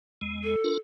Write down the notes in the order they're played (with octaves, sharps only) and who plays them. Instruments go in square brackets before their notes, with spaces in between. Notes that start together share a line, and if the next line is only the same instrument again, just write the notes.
[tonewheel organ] E2 G#3
[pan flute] A4
[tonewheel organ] D4 F4 A#4